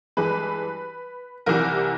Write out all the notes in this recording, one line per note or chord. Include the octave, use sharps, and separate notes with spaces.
G2 E3 G#3 B4
C2 C3 E3 G3 A#4